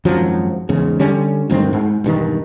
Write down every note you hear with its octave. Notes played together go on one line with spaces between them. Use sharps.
G#1 F#2 F3 F#3
E2 G#2 C#3
D3 G3 C#4
D2 G2 D#3 C4
G#2
E1 G2 D#3